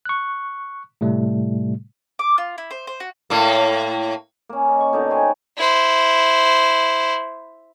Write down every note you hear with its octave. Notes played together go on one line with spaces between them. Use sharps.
C#6 F#6
A2 C3 G3 A3
D6
F4
E4
C5
C5
F#4
A2 A#3
A#3 C#4
D#5
C#6
B2 D3 D4 D#4
C5 C#5 G5 G#5
E4 C5